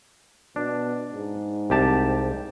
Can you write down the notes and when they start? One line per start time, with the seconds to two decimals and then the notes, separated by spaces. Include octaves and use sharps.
0.56 B2 D4
1.13 G#2
1.70 C2 G4 A5